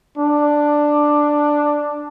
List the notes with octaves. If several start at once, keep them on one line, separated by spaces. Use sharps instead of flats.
D4